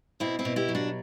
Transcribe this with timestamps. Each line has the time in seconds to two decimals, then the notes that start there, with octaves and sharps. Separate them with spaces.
0.20 B2 C4 E4
0.39 C4 E4
0.45 B2
0.56 E4 G4
0.69 F#3
0.75 D4 F#4